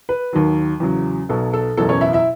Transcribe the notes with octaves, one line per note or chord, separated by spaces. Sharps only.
B4
D#2 D#3 F#3
E2 C#3 F#3
B1 B2 F#3 A4
A4
F#1 E2 B2 F#3 A4
C#4 C#5
E4 E5
E4 E5